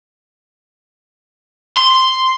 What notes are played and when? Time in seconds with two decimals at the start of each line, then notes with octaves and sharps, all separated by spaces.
1.77 C6